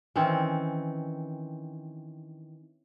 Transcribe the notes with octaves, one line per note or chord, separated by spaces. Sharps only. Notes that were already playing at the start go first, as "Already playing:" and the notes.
D#3 E3 C4 C#4